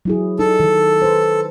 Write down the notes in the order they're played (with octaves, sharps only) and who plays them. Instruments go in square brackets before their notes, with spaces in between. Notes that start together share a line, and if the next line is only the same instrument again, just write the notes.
[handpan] F#3 E4 G#4
[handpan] D#4 [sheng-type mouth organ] A4
[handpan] D#3
B4 C5